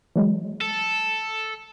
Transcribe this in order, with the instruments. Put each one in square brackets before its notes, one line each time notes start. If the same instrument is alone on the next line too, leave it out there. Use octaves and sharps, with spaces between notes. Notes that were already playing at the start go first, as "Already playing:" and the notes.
[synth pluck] E3 F#3 G#3
[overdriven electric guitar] A4